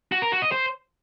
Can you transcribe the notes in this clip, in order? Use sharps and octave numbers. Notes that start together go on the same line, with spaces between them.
F#4
A#4
F#4
D#5
C5